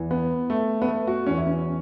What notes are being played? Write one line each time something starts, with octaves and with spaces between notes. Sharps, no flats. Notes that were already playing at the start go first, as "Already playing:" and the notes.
Already playing: E2 E3
B3
A3
B3
A3
F#4
E2 E3 C#4
E4
C#4